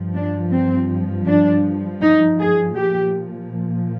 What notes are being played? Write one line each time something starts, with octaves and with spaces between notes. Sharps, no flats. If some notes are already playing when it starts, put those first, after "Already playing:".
Already playing: G2 F3
D4
C4
D4
D#4
G#4
A#2 F3 G4